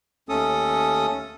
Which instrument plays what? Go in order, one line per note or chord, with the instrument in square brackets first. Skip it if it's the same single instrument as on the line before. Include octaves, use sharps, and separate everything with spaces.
[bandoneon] D#2 A3 C#4 A4 D#6